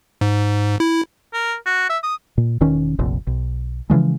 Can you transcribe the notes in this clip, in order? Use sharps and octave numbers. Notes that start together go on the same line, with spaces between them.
G#2
E4
A#4
F#4
E5
D#6
A#2
E1 D#3 C#4
F1 A#1 F2
B1
C#3 E3 F3 G#3